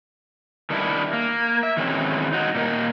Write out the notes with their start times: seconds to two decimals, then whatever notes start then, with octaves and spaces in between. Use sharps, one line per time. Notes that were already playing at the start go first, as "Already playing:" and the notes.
0.70 D#3 G3 D4 E4
1.13 A#3
1.63 E5
1.77 D#3 E3 F#3 G#3 C4 C#4
2.33 D#4 F#4
2.55 A#2 A3 A#3 A#4 D#5